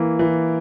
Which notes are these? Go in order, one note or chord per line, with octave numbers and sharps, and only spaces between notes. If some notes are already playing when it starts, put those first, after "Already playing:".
Already playing: E3 A#3
E3